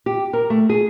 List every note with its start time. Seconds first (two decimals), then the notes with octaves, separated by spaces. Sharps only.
0.06 G4
0.33 A#4
0.50 A3
0.69 G#4